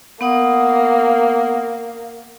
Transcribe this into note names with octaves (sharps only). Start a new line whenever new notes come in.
A#3 B3 F#5 D#6